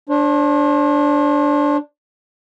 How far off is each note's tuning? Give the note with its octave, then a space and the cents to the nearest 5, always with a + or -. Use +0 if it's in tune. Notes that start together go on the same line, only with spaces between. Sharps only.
D4 -5 C5 +40